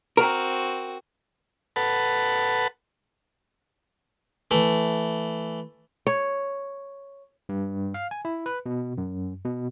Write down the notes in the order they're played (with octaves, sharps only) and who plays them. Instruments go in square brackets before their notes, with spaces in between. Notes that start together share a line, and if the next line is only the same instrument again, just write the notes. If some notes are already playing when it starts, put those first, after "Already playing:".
[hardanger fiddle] C4 F#4 [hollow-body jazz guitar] A#4
[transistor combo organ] A4 B4 F#5 A5 B5
[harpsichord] E3 A3
[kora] C#5
[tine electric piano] G2
F5
G#5
E4
B4
B2
F#2
B2